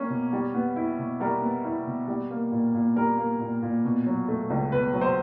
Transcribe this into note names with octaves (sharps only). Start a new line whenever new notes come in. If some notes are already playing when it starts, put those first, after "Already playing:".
Already playing: G3 A#3 C#4
B2
G3
B3
E4
B2
G3 A#4
B3
E4
B2
G3
A#3
A#2
A#2
G3 A#4
A#3
A#2
A#2
B2
F#3
A3
C#2
B2 B4
F#3
C5